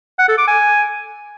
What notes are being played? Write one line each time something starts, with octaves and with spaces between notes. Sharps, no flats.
F#5
A4
D6
G#5